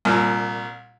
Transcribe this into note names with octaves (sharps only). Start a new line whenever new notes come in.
C2 A#2